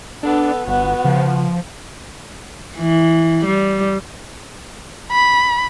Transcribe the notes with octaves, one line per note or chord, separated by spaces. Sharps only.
B3 D4 A4
G1 B3 F#4
C#3 F3
E3
G3
B5